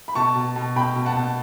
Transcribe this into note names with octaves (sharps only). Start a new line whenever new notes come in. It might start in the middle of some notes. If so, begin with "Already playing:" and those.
B5
B2 A5 C#6
B2
B2
B2 G5 B5
B2
F#5 A5
B2